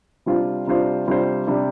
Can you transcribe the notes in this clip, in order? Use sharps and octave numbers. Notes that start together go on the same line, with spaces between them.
C3 G3 D4 F4 C5
C3 G3 D4 F4 C5
C3 G3 D4 F4 C5
C3 G3 D4